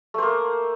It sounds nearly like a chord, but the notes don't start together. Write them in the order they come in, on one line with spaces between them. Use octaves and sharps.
A3 C5 A#3